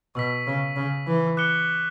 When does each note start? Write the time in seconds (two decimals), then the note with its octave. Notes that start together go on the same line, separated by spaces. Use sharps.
0.15 B2 C#6 E6 B6
0.47 C#3
0.76 C#3
1.07 E3
1.37 D6 F#6 C#7 G7